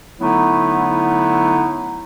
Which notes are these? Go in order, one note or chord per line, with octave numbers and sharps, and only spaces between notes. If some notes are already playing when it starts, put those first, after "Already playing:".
D3 F#3 A3 B3 D#4 E4